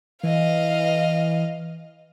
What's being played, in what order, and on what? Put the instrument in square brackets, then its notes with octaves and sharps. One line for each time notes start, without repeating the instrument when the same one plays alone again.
[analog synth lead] E3 [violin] D#5 F5